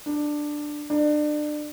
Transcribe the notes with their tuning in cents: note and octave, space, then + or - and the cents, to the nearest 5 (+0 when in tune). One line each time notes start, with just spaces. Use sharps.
D4 +10
D4 +30